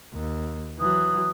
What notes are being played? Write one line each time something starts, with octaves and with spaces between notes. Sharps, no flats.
D#2
E3 F#3 D#6